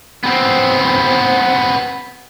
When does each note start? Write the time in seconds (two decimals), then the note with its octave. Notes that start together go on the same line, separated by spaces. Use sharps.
0.23 B3 C4